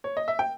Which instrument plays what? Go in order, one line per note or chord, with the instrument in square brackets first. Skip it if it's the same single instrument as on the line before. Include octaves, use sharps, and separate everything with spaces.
[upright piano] C#5
D#5
E5
G5